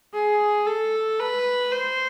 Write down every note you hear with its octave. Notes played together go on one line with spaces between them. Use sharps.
G#4
A4
B4
C5